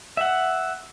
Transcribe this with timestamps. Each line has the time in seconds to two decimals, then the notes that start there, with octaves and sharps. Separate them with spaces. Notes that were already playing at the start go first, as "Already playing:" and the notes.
0.17 E5 F#5